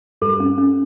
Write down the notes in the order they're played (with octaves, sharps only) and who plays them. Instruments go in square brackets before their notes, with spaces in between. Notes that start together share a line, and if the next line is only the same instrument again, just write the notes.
[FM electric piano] G2 G3 [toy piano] A4
[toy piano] C#4
C#4